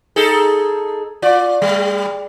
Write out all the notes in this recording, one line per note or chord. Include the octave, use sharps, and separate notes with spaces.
D#4 G#4 A4
F4 D5
G3